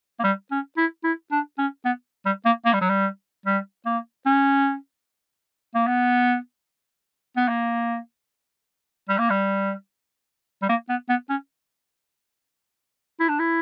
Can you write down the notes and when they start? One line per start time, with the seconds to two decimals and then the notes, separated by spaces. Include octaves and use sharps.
0.19 A#3
0.24 G3
0.51 C#4
0.77 E4
1.04 E4
1.31 D4
1.58 C#4
1.85 B3
2.25 G3
2.45 A#3
2.65 A#3
2.73 G3
2.81 F#3
2.89 G3
3.46 G3
3.86 A#3
4.26 C#4
5.75 A#3
5.87 B3
7.36 B3
7.48 A#3
9.09 G3
9.18 A#3
9.30 G3
10.62 G3
10.69 A#3
10.89 B3
11.09 B3
11.29 C#4
13.20 E4
13.29 D4
13.39 E4